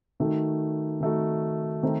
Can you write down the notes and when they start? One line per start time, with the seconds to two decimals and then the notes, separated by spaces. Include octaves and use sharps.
0.20 D#3 A3 D#4 F#4
1.00 D#3 A3 D#4 F#4
1.83 D#3 A3 C4 D#4